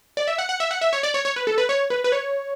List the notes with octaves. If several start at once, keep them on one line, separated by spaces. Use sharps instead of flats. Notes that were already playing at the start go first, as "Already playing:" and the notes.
D5
E5
F#5
F#5
E5
F#5
E5
C#5
D5
C#5
C#5
B4
A4
B4
C#5
B4
B4
C#5